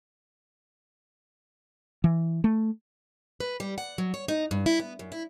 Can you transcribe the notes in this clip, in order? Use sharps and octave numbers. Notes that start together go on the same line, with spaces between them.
E3
A3
B4
G3
F#5
F#3
C#5
D#4
G2
E4
B3
F#2
E4